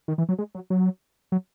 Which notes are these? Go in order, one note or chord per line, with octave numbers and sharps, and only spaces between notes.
D#3
E3
F#3
G#3
F#3
F#3
F#3